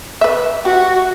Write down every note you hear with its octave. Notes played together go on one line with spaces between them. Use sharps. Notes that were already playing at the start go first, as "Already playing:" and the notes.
B4 E5
F#4 G4